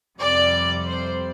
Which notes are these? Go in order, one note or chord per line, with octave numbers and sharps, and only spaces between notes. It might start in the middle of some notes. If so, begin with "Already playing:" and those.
F2 C3 G3 D5
C5